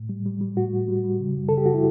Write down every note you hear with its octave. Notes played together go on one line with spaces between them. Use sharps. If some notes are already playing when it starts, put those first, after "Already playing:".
Already playing: A2
G3
G3
G3
A2 F#4
G3
G3
G3
C#3
F#2
C#3 A4
G4
F#4
E4